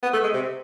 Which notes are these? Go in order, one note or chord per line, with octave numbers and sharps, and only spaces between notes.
B3
A3
G#3
C3